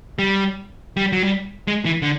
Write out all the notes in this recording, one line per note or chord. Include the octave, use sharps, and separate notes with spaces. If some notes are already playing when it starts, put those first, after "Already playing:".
G3
G3
F#3
G3
G#3
E3
D3